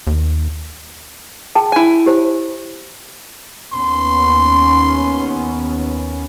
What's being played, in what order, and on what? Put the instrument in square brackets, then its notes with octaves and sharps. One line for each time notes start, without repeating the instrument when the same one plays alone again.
[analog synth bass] D#2
[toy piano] G#4 G5 A5
[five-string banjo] E4 G#5
[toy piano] G4 C5 C#5
[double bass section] D#2 B3 C#4 [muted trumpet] C6